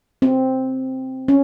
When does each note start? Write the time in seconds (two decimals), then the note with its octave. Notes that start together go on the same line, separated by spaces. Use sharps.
0.22 C4
1.28 C#4